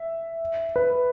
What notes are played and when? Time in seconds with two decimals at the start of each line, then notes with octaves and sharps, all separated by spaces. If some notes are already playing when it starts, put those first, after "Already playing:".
Already playing: E5
0.76 B4